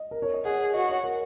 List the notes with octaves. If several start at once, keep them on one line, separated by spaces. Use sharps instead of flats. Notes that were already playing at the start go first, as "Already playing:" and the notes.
Already playing: D#5
A#4
C#5
D#5
G#4 F#5
F#4 D#5
C#5
A#4